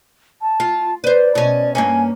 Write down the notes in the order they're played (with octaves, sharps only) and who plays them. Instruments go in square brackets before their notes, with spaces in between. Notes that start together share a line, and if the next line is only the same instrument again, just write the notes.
[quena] A5
[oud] F4
[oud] B4 C5 [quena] D5
[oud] B2 C#4
[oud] G2 A#3 C#4 [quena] G#5